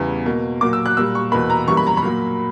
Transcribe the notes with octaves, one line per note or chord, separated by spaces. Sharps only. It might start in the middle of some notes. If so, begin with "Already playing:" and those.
Already playing: E2 C#3 E3 G3
B2 A#3
A#2 F#3 A#3 D6
E6
F#6
A#2 G3 A#3 E6
C#6
E2 B2 A#3 B5
A#5
F#2 E3 G3 A#3 C#6
B5
A#5
B5
A#2 F#3 A#3